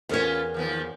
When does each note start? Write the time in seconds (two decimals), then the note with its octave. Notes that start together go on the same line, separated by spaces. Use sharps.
0.09 E2 B3 C#4 F4 A#4 C#5
0.54 D#2 F3 B3